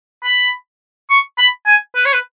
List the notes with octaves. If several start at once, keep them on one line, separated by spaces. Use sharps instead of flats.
B5
C#6
B5
G#5
B4
C#5
B4